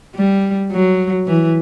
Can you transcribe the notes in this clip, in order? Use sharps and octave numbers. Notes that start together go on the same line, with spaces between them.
G3
F#3
E3